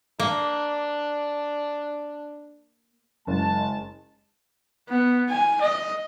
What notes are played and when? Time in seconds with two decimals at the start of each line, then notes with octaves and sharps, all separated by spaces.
0.20 A#3 D4
3.27 F#1 G#3 A5
4.89 B3
5.29 G#5
5.62 D#5